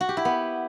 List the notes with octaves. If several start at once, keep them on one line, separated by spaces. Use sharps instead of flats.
F#4
G4
E4
B3